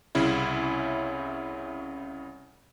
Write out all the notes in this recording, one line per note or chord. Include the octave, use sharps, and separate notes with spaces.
C2 C#3 C#4 E4 E5